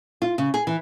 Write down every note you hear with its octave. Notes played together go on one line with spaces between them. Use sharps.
F4
C#3
G#4
E3